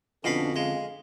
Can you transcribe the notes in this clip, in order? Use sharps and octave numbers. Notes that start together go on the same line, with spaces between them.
F2 B2 D3 C#4 D4 F5 B5
G#3 F5